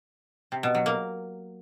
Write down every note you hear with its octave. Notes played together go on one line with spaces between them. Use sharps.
C3
B2
F#3
A#3